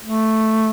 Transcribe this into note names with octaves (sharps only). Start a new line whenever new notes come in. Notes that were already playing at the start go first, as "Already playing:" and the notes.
A3